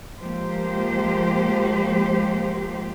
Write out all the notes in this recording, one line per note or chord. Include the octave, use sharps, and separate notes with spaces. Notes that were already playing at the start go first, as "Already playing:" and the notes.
F3 G#3 A#3 G4 C5